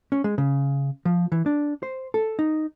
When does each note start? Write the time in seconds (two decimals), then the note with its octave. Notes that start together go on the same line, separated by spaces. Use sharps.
0.12 C#4
0.24 G#3
0.38 C#3
1.05 F3
1.32 E3
1.46 D4
1.83 C5
2.14 A4
2.39 D#4